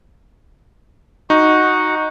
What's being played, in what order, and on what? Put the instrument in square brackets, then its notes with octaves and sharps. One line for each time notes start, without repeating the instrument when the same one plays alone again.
[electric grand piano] D#4 [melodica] F#4 F#5